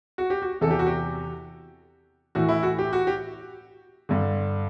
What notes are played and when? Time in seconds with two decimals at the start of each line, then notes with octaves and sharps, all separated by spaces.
0.18 F#4
0.30 G4
0.42 F#4
0.61 E2 C3 E3 A4
0.71 G4
0.79 F#4
0.86 G4
2.35 A2 E3 F#4
2.49 E4
2.63 F#4
2.78 G4
2.93 F#4
3.07 G4
4.09 G2 D3